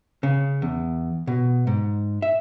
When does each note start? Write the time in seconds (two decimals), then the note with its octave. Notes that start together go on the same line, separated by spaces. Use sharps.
0.23 C#3
0.62 E2
1.27 B2
1.67 G#2
2.22 E5